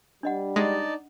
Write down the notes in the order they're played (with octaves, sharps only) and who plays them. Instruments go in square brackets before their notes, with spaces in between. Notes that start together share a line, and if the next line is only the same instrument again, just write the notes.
[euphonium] G3 [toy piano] D4 D#5 F#5
[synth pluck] G#3 [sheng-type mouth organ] D#4 D5 A5